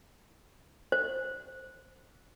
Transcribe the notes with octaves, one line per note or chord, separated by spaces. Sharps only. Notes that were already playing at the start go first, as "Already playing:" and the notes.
C5